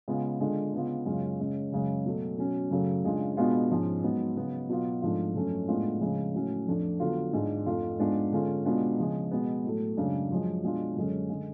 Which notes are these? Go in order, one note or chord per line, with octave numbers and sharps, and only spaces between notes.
C#3 G#3 B3 F4
D3 G#3 D4 F4
C#3 G#3 B3 F4
F#2 C#3 G#3 C#4 F4
C#3 G#3 C#4
F#2 C#3 G#3 C#4
B2 F#3 A3
B2 F#3 C#4
F#2 C#3 F#3 A3
C#3 G#3 D4 F4
B2 G#3 B3 D4 F4
G#2 F3 G#3 C#4
G#2 F#3 B3
C#3 F#3 B3
B2 F#3 B3 F4
G#2 F3 A3 D4 F4
F#2 F3 A3 C#4
A2 G#3 B3 D4 F4
C#3 F3 G#3
A2 F#3 A3 C#4
F2 F3 A3 D4 F4
D3 F#3 B3 F4
G#2 G#3 D4 F4
F2 F3 A3 F4
G#2 G#3 B3 D4 F4
D3 G#3 C#4 F4
B2 G#3 B3 D4 F4
C#3 F3 G#3
B2 G#3 B3
A2 F#3 A3
F#2 C#3 G#3 D4
F#2 F3 G#3
B2 G#3 D4 F4
F#2 D3 G#3 C#4
D3 G#3